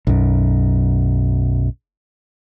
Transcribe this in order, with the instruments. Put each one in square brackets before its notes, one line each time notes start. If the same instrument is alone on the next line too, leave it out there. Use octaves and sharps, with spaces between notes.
[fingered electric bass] B1 F#2